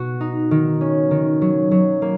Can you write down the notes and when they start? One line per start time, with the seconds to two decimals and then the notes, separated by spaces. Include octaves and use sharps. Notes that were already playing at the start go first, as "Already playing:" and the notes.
Already playing: B2 F#4
0.20 D#4
0.51 D#3
0.81 C#4
1.11 D#3
1.41 F#3
1.71 F#3
2.02 A#3